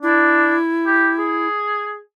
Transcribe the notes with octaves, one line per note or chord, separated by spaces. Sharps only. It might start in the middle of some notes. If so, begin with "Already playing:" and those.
D4 E4
G4
G#4